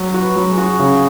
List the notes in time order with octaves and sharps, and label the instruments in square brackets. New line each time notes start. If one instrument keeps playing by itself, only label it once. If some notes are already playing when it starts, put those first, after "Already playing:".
Already playing: [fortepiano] F#3
F#4
[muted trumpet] B4
[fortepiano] F#3
[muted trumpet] G#4
[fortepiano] F#4
C#3